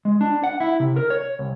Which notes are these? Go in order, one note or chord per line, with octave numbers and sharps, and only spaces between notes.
G#3
D4
F#5
E4
C3
A#4
C#5
C2